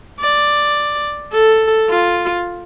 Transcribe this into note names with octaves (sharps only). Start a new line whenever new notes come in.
D5
A4
F4